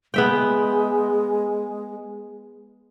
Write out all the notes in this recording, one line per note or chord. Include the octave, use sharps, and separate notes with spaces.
G#3 B3 E5 G5